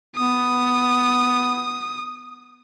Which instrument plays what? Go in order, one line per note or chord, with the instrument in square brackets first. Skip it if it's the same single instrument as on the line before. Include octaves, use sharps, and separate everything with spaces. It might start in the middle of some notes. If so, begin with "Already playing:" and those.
[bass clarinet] B3 [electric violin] D#6